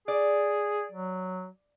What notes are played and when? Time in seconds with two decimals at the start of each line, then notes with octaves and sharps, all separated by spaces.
0.08 G#4 D5
0.92 F#3